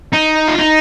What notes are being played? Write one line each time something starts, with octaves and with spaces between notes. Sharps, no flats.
D#4
F4
D#4